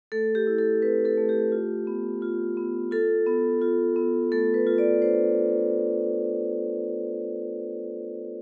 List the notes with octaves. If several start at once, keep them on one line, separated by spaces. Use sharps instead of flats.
A3 A4
G4
E4
A4
C4 B4
A4
A3
G4
F4
B3
F4
B3
F4 A4
B3
F4
B3
A3 A4
B4
F4
D5
D4 C5